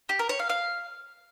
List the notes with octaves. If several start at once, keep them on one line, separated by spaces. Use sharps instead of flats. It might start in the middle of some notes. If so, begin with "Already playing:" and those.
G4
A#4
C#5
F5
F5